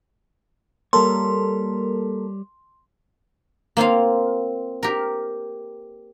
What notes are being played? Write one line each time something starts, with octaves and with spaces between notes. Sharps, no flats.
G3 A#3 A4 A#4 C#5 C6
A#3 C4 F4 F5
G4 A#4